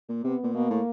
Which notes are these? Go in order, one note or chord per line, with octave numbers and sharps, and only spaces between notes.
A#2
C3 B3
A#2
B2 A#3
A2